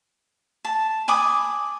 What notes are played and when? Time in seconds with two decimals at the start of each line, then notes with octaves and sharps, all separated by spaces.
0.65 A5
1.08 G#5 B5 D6 D#6